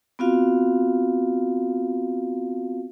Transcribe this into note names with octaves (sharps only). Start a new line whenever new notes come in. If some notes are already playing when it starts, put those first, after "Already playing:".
B3 C4 F4 F#4 F5